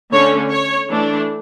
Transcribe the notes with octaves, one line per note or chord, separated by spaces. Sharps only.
D3 A3 C#4 C#5
C#5
E3 A3 D4